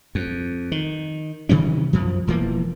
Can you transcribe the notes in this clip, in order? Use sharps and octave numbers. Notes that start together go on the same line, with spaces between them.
F2
D#3
C3 D#3 E3 C#4
F#2 F3
E1 E3 F3 A#3